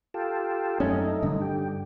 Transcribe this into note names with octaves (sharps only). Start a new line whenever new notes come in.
F4 G4 A4
F#2 A3 C#4 D#4
G2 D3
G4